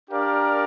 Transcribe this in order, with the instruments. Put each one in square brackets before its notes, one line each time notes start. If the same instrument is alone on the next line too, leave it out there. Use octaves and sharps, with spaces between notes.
[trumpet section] D4 G4 A#4 D5 F5